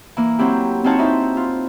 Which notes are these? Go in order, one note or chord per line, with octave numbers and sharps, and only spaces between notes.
E3 A#3
F#3 C4 E4 G4
C4 D#4 F4 F#4 C#5 A5
D#4 E4 C5 E5
F4